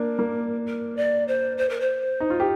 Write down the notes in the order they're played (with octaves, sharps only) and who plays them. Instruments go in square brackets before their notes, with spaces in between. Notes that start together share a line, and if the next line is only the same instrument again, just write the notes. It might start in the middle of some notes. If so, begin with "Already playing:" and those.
Already playing: [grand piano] A#3 D4 [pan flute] A#4
[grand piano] A#3
[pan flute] A#4
D5
C5
C5
A#4
C5
[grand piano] D#4
F4
G4